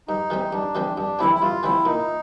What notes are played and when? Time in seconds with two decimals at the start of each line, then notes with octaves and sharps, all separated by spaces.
0.08 G2 D#4
0.30 E3 G3 C4
0.52 G2 D4
0.75 E3 G3 C4
0.97 G2 D4
1.19 E3 G3 C4 E4
1.35 E4
1.42 G2 F4
1.63 E3 G3 C4 E4
1.85 A#2 D#4